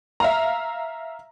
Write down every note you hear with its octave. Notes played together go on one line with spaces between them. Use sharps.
E5 F5 A#5